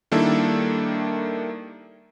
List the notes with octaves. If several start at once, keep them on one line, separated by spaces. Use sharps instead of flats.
D#3 G3 A#3 D4 E4 A4